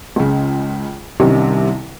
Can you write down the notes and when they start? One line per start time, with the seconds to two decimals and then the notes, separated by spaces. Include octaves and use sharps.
0.16 C#2 C#3
1.20 C2 C3 D#3 G3 C#4